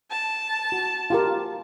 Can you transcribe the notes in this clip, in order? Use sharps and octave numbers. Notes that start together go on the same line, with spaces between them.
A5
F#4
F4 G4 A#4